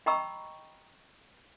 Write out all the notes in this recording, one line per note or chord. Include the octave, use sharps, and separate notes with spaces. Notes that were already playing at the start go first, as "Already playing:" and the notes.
D#5 G5 A#5 B5 C#6 E6